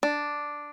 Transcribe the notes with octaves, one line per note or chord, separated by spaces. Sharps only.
D4